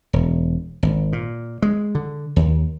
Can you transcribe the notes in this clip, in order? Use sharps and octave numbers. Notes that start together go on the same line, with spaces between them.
E1
G#1
A#2
G#3
D3
D#2